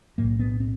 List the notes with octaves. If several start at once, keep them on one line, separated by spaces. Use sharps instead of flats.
B1 A2 A#3
B3
C4